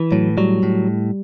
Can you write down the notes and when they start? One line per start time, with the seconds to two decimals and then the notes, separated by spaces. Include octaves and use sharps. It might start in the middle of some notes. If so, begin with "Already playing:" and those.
Already playing: E3
0.12 A2 F#3
0.37 F#3 G3
0.63 A2